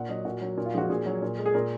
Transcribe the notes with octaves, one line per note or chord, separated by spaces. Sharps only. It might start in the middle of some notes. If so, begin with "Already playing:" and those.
Already playing: A#2 F#5
F#3 D#5
A#2 F#4
F#3
A#2
F4
F3 G#3 F#4
A#2 G#4
F#3
A#2
G#3
G#4
A#2 A#4